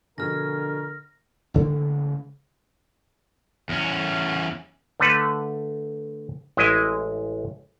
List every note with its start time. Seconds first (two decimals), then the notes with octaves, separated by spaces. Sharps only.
0.18 B2 D3 F3 G#4 A#4 F6 A#6
1.54 A1 C#3 G#3 A#3
3.69 E2 C#4
5.00 D3 A3 A4 B4
6.57 A1 G#3 E4 D#5 G#5